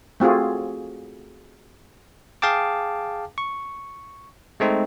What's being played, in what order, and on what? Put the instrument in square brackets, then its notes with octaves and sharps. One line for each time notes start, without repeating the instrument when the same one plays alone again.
[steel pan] A3 C4 F4 F#4 G#4
[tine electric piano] G#4 F5 G5 A5 D6
C#6
G#3 A3 C4 D#4